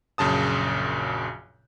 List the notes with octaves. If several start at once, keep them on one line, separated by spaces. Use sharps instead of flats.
A#1 F#2 C#3 A5 D#6